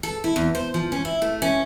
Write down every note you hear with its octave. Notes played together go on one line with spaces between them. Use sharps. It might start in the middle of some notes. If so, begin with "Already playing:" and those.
A4
E4
E2
C5
F3
C#4
E4
A3
C#4